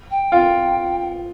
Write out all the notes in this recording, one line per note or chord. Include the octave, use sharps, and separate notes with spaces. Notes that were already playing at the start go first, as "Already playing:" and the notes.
G5
F4